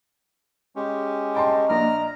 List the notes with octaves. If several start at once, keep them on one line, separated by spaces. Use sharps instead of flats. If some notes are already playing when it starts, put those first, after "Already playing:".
G#3 C#4 G4
D#5 G5 A5 C6
A#1 D4 A#5 F6